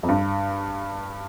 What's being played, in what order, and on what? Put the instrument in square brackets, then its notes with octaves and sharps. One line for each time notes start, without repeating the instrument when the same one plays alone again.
[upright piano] F2
G2